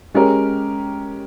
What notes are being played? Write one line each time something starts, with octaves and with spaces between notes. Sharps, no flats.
G#3 C#4 G4 A#4